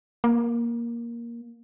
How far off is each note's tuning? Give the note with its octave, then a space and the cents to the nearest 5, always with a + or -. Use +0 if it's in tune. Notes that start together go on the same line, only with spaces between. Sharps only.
A#3 +10